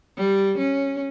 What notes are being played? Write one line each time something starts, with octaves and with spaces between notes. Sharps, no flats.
G3
C#4